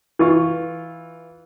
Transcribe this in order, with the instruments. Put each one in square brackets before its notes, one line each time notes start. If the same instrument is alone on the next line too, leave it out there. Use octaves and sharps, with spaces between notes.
[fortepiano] E3 F4 C#6